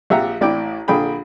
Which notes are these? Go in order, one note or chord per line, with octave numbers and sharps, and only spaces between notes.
A#1 G4 E5 F#5 A#5
A1 E4 D5 G5
A#1 D3 G#4 G5 B5